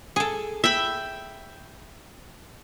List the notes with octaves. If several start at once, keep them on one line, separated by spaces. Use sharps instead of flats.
G#4 A4
E5 G5 B5